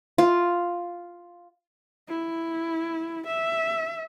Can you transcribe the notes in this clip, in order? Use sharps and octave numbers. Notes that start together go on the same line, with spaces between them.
F4
E4
E5